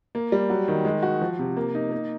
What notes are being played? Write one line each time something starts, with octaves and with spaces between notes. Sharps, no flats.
A#3
G3
F#3
D#3
G#3
F#4
F3
C3
A#3
D#4
A#3